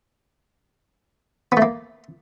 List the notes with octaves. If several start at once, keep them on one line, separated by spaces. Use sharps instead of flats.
B3
A3
A#3